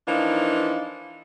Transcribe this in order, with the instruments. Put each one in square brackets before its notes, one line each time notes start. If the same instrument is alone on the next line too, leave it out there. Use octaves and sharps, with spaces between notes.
[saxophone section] E3 F3 A#3 D4 D#4